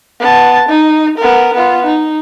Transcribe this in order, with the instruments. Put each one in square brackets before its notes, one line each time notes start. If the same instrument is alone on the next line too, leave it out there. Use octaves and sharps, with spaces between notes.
[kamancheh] B3 A5
D#4
B3 A#4
B3 F4
D#4